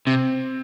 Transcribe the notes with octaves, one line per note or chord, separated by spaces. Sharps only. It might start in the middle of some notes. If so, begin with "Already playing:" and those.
C3 C4